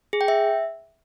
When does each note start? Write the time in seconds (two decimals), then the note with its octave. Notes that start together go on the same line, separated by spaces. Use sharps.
0.13 G#4
0.21 G5
0.28 E5